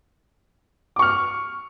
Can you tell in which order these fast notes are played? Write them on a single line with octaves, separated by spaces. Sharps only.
D6 C#6 F6